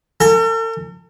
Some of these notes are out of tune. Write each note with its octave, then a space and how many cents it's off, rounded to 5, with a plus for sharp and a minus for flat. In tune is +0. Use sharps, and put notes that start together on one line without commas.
A4 +45 G#5 +0